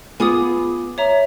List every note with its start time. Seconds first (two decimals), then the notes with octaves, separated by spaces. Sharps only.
0.20 B3 F4 G#4 G#5 D6 D#6
0.98 C#5 E5 A#5